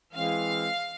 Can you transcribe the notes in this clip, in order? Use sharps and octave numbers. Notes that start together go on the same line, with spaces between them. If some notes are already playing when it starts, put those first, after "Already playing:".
E3 G#3 C4 F5